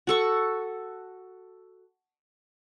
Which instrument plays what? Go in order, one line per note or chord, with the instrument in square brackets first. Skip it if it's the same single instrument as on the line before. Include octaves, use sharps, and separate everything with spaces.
[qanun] F#4 A4 C#6